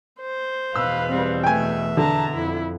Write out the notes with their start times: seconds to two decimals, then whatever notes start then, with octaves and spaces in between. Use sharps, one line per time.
0.21 C5
0.76 E2 B2 B4 F5 E6
1.10 G3 C4
1.43 A3 E5 G5 G#5
1.97 D3 A5 A#5
2.35 F2 E4